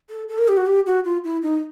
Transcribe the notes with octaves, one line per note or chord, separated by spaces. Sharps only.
A4
A4
A#4
G4
F#4
G4
F#4
F4
E4
D#4